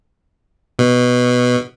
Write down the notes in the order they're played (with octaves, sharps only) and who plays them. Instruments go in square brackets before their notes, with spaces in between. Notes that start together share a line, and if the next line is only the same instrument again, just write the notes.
[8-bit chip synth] B2